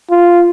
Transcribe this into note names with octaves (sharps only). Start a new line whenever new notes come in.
F4